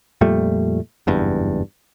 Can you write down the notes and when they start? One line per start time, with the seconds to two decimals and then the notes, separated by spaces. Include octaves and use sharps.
0.21 F2 A#2 G3 A3
1.07 F#1 E2 G2